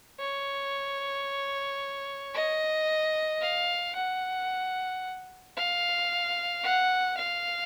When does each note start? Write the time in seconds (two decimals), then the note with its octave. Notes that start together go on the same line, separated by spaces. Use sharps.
0.20 C#5
2.34 D#5
3.41 F5
3.95 F#5
5.57 F5
6.64 F#5
7.17 F5